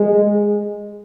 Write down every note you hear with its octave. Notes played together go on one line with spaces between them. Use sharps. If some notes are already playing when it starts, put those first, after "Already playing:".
Already playing: G#3